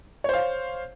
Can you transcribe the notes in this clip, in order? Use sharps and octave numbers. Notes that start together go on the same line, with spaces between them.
C5 C#5 F5